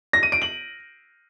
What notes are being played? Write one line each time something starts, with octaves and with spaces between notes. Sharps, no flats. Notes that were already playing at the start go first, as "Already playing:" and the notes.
A#6
D#7
D7
F#7